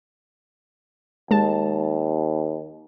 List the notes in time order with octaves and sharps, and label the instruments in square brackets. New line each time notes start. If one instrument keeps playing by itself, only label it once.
[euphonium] D#2 [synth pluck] G#3 A5